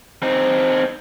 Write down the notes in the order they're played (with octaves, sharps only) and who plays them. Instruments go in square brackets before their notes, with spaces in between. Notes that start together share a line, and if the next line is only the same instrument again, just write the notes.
[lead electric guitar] C4 D#4